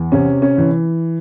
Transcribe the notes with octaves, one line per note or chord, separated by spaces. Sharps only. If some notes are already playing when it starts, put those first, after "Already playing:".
Already playing: E2
C3 C#4
C#4
E3